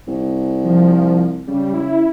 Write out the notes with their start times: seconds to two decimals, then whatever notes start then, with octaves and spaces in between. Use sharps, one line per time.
0.07 C2
0.64 F3
1.47 C#3 G3
1.74 E4